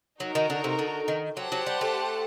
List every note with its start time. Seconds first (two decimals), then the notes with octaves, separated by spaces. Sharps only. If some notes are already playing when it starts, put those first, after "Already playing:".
0.20 F#3 D#4 F#4 A#4
0.35 D#3
0.50 D3
0.64 C3
0.79 D3
1.08 D#3
1.37 F#3 G4 C5 F#5 A5
1.52 F#3
1.67 G3
1.81 A3